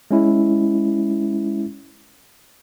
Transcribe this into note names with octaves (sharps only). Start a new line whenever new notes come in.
G#3 C#4 E4